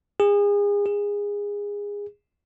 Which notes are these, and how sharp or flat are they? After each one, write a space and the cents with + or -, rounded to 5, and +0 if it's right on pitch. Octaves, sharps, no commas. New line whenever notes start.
G#4 -30
G#4 -20